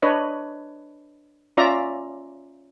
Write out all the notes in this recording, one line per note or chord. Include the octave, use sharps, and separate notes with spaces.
D4 B4 C#5 D#5
C#4 F4 D5 E5 A#5